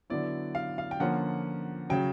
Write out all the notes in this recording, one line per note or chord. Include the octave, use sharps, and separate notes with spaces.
D3 F#3 B3 E4 D5
F5
F5
G5
D3 F3 A#3 C#4 F4 F#5
C#3 F#3 G5